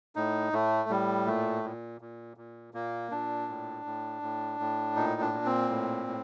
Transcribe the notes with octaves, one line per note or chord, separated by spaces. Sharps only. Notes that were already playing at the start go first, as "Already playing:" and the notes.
A2 D#4
A2 A3
A2 G3
A#2 A3
A#2
A#2
A#2
A#2 A#3
A#2 D4
A2
A2
A2
A2
A#2 D#4
D4
A#2
C4
A2
A2